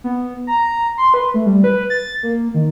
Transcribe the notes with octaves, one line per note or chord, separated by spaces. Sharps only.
B3
A#5
C6
B4
A3
G3
B4
A6
A#3
D#3